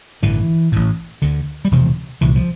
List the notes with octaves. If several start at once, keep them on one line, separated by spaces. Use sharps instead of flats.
A1 G2 D3 E3
A1 A2
D2 D3
G3
E1 D2 C3 F3
C2 A#2 E3
F3